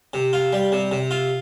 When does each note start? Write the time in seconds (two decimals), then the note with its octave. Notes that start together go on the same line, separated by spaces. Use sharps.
0.14 C3
0.33 F4
0.53 G3
0.72 C3
0.91 C3
1.11 F4